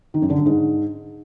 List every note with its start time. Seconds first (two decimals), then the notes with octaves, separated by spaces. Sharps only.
0.14 D#3
0.22 F#2
0.30 D3
0.38 G2
0.46 G#2